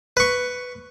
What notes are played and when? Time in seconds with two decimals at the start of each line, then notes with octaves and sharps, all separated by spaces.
0.17 B4 C#6